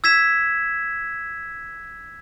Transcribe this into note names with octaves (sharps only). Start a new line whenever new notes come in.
E6 G#6 B6 E7